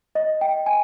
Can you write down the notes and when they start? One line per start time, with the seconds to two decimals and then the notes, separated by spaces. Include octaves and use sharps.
0.15 D#5
0.41 G5
0.66 G#5